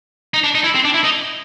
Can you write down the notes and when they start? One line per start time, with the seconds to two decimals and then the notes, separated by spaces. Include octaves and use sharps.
0.34 D#4
0.44 D4
0.55 D#4
0.64 E4
0.75 C4
0.85 D4
0.94 E4
1.04 D#4